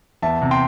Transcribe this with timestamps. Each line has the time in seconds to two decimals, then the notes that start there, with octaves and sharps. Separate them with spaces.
0.22 E2 E5 A5
0.42 C3
0.51 G5 C6